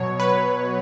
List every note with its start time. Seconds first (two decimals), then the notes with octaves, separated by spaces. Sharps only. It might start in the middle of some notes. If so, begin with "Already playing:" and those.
Already playing: B2 F#3 C#5
0.20 B4